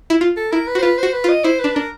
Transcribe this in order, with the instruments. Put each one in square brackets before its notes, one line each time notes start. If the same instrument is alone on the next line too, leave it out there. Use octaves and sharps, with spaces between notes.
[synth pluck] E4
F4
[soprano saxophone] A4
[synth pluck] E4 [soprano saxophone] A#4
[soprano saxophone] B4
[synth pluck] F#4
[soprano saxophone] C5
[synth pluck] F4 [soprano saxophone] B4
[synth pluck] F#4 [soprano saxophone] C5
[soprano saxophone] B4
[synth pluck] F4 [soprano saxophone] D#5
[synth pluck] E4 [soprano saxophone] C5
[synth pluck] D4 [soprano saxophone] B4
[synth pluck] D4 [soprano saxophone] A#4